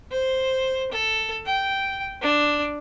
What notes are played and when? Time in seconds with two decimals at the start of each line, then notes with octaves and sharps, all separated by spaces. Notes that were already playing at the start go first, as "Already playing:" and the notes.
0.12 C5
0.92 A4
1.46 G5
2.22 D4